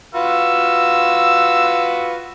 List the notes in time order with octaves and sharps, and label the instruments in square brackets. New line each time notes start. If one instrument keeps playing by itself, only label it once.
[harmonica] F4 F#4 B4 [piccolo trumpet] E6